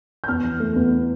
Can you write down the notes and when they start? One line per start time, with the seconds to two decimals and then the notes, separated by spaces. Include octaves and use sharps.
0.24 G6
0.28 E2 F6
0.44 E3
0.60 A3
0.76 E2